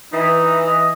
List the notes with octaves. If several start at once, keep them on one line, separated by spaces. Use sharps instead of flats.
E3 D#4
D#5